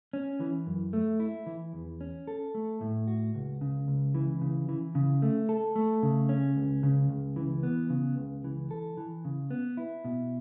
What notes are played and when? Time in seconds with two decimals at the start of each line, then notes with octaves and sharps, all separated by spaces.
0.13 C#4
0.40 E3
0.67 F#2
0.93 A3
1.20 E4
1.46 E3
1.73 E2
2.01 C#4
2.27 A4
2.55 A3
2.81 A2
3.08 F#4
3.35 C#2
3.61 C#3
3.88 C#2
4.15 E3
4.41 C#3
4.69 E3
4.95 C#3
5.22 A3
5.49 A4
5.76 A3
6.03 C#3
6.29 C#4
6.57 C#2
6.83 C#3
7.09 C#2
7.36 E3
7.63 B3
7.90 C#3
8.17 C#2
8.44 E3
8.71 A4
8.97 E3
9.25 C#3
9.51 B3
9.77 E4
10.05 B2